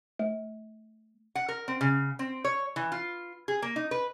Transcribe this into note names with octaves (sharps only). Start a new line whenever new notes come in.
A3
F#5
A#4
C4
C#3
C4
C#5
E3
F4
G#4
A#3
D#4
B4